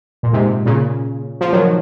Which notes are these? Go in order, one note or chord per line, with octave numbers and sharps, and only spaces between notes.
A#2
G#2 C3
A#2 C#3
F3
D#3 F#3